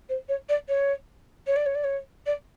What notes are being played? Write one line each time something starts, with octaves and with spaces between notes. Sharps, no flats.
C5
C#5
D5
C#5
C#5
D5
C#5
D5
C#5
D5